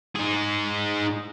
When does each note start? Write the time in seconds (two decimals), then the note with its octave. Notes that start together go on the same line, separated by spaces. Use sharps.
0.15 D#4 G#4